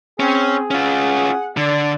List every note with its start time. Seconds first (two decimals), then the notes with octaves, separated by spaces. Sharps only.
0.20 C4 C#4 G#4
0.71 C#4 F4 F#5
1.57 D3 D5